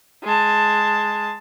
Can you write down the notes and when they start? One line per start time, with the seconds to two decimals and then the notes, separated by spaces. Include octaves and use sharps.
0.23 G#3 A5